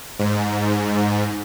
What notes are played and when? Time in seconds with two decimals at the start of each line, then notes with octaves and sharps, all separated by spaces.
0.19 G#2